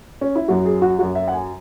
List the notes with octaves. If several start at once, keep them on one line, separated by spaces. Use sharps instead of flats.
C#4
E4
F#2 F#3 F#4
G#4
F#4
F#2 F#3 F#4
E5
F#5
G#5